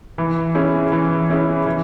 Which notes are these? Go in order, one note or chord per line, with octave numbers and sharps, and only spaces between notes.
E3
C#4 E4 G#4
E3
C#4 E4 G#4
E3